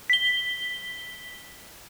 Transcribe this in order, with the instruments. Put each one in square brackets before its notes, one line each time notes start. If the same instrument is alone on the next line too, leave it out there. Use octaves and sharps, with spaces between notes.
[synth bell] B6 G7